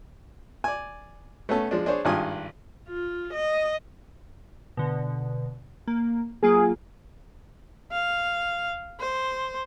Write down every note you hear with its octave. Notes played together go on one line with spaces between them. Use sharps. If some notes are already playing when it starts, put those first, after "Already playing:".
D5 G#5
A3 B3 C#4 A4
F3 G#3 D4
D4 G#4 C5 C#5
G#1 G2 D#3 F4 G#5 D#6
F4
D#5
B2 D3
A#3
F#3 A#3 F4 G#4
F5
C5